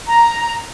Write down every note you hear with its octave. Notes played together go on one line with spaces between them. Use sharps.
A#5